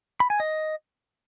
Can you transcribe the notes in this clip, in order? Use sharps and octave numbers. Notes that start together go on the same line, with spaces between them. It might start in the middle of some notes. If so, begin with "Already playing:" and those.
B5
G#5
D#5